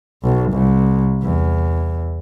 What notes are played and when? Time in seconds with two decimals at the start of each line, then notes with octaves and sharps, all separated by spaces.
0.23 B1
0.52 C2
1.23 E2